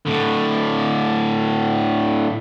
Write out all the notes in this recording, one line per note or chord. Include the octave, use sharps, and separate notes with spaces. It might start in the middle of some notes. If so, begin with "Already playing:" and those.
A2 D3